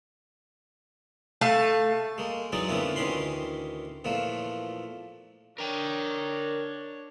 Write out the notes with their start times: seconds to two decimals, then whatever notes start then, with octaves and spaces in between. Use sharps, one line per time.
1.41 A3 F5 A5
2.18 G#3 A#3
2.52 E3 F#3 G#3 D#4 D5
2.69 F2 D3 A#3 B3 C#4 E4
2.96 D2 D#3 E3 C#4 B5 C6
4.05 E2 A#2 F3 A3
5.58 D4 A#4 C#5 G5